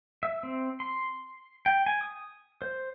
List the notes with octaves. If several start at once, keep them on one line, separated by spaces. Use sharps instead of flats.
E5
C4
C6
G5
G#5
D#6
C5